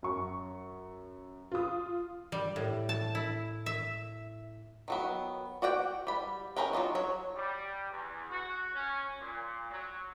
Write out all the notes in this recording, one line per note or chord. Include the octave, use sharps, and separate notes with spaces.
F#2 C#6
F4 D#6
G3
A2
A5
E4
E5
D#3 F#3 B3
F#4 D5 F#5 G5
G3 B5
B3 C#4 A#4 B4 G5
F#3 D4 D#4 F4
F#3 C#5
G3
E2
F#4
C#4
A#2
F#3